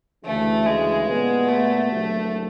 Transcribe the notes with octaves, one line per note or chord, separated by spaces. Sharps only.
D2 C#3 E3 A3
G#3
A#2 G3 B3
A3
F#1 F2 D3 F#3